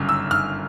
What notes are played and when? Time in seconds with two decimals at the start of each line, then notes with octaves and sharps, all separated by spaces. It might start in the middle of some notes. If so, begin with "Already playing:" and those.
Already playing: G1 F#2 C#3 F6
0.09 E6
0.31 F6